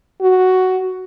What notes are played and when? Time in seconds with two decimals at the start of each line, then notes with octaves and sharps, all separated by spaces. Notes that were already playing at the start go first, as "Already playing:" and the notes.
0.21 F#4